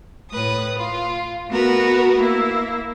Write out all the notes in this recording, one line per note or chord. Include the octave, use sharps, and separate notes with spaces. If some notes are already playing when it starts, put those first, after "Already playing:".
A2 B4 D#6
F4
A3 B3 F#4 A#4 B4
A#3 E4